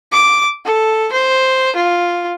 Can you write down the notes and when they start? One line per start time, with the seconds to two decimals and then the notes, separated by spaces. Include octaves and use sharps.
0.12 D6
0.66 A4
1.13 C5
1.76 F4